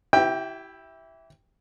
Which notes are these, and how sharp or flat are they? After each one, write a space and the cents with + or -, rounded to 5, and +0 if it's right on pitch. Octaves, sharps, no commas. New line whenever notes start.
E4 -5 G4 -35 G5 +10